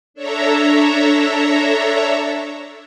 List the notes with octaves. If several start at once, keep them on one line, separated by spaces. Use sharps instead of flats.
D4 A4 C#5 E5 A#5